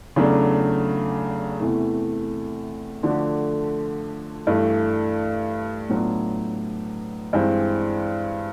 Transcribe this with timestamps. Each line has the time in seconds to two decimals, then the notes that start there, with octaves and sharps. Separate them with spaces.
0.16 E2 C#3 F#3 A3 D4
1.60 E2 C3 E3 A3
3.03 D3 F3 A3 D4 F#4
4.47 G2 E3 A3
5.90 A2 F#3 B3 D4 F4
7.33 G2 E3 G#3 C4